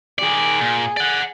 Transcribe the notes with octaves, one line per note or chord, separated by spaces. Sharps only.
D#3 G#4 D5
A#2
D5 F#5